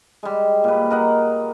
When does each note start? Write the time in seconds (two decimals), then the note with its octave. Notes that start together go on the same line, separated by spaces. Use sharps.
0.23 G3 G#3
0.64 A#2 B4
0.90 A#4 D#5 F#5